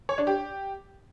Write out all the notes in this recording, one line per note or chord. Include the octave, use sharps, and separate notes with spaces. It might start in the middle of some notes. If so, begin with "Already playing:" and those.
C#5
D4
G4